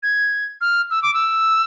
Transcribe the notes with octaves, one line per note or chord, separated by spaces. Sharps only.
G#6
F6
E6
D6
E6